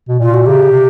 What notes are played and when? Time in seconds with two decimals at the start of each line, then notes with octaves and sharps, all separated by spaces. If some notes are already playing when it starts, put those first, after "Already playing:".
0.09 B2
0.20 A#2 F4
0.34 F#4
0.46 C#3 G4
0.72 C3